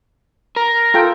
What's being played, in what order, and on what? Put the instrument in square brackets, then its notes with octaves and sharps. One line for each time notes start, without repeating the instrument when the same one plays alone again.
[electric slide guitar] A#4
[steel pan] F4 A4 G5